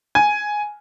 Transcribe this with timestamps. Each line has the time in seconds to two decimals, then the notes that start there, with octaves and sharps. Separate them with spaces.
0.15 G#5